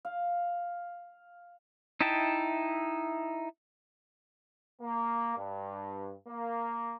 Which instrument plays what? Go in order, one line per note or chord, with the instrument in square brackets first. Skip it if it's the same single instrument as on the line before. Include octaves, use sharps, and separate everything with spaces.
[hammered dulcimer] F5
[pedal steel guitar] D#4 E4 E5 G5 A5
[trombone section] A#3
G2
A#3